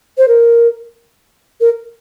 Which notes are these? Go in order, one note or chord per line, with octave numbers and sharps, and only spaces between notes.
C5
A#4
A#4